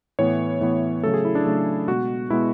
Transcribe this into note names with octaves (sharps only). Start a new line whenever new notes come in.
A2 E3 B3 C#5
A2 E3 B3
C#3 F#3 A3 A4
G#4
E4
D4
C#3 F#3 A3
B2 G#3 B3 F#4
B2 G#3 B3 E4